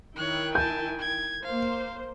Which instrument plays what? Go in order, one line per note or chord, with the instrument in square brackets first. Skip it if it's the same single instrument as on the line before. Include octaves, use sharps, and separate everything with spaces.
[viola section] D#3 E4 G5 [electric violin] C#5 F#6
[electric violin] G#5 A5 [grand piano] G6
[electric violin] G#6
[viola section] A#3 C5 [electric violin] F5